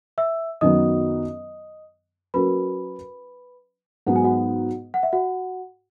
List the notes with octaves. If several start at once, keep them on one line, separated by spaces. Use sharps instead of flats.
E5 E6
F#2 D#3 F#3 B3 D#5 D#6
F#3 C#4 F#4 A#4 B4 B5
G#2 F#3 B3 D#4 F#5
G#5
F#4 F#5
F#5
E5
F#4 F#5